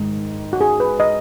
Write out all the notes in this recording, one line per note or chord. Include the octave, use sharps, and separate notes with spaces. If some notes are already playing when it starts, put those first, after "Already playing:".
Already playing: G#2 D#3 G#3
F#4
G#4
B4
D#5